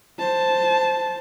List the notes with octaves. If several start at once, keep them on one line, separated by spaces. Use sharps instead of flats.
C5 A5